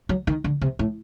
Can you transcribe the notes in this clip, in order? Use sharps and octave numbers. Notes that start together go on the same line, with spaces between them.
F#3
D#3
D3
C3
A2